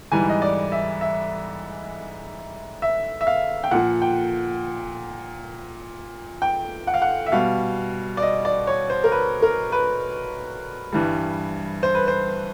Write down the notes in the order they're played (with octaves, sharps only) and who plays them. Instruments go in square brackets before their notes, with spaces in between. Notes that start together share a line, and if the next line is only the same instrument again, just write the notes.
[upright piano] G#2 E3 G3 G#5
D#5
D5
E5
E5
E5
E5
F5
G5
A#2 F3 F#5
G5
G5
F#5
F5
F#5
E5
B2 G3 F5
D5
D#5
D5
C#5
C5
A#4
B4
A#4
B4
G2 E3 G3
C5
B4
C5